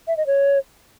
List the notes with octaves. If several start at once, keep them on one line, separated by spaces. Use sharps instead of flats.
E5
D#5
C#5